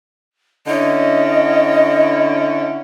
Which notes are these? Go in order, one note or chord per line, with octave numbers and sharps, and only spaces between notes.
D3 C#4 E4 D#5